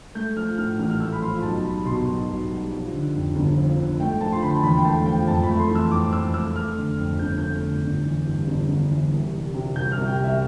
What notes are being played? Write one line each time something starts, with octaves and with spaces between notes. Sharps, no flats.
A3 G6
F3 F6
A2 F6
A1 F6
F6
A3 E6
B5
F3 C6
B1 A5
G3 B5
B2 C6
B1
B1
G3
F3
D3
F2
G1
F3
D3
A3 G5
F3 A5
C6
D3 B5
A5
E2 B5
G5
A3 A5
F3 G5
F2 A5
B5
A3
C6
E3
E6
F2 D6
F2 E6
A3 E6
A3 F6
D3
F2
G1 G6
A3 G6
D3
G1
E3
G2
G1
G1
E3
C2
G3
C3
C2 G6
F6
C2
G5
G3
E5